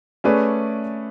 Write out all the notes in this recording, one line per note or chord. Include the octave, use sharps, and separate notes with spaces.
A3 C#4 G#4 B4 D5